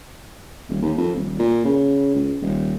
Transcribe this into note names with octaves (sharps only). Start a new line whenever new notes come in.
D#1
D#2
F2
D#1
A#2
C#3
C#2
D#1